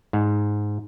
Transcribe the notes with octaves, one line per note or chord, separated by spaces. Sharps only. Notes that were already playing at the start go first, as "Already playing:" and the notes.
G#2